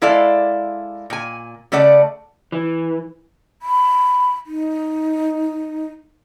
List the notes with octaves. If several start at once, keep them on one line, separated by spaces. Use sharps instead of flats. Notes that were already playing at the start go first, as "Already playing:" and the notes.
G#3 E4 A4 D5 F5
A#2 G#5
C#3 A3 A4 D5 F#5
E3
B5
D#4